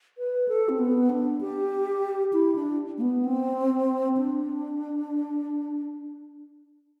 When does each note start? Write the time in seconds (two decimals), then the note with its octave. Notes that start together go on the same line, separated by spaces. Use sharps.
0.18 B4
0.48 A4
0.69 C4
0.79 B3
1.10 D4
1.41 G4
2.33 E4
2.55 D4
2.98 A3
3.01 B3
3.25 C4
4.17 D4